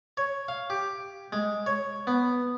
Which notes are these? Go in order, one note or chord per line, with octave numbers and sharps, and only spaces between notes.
C#5
F5
G4
G#3
C#5
B3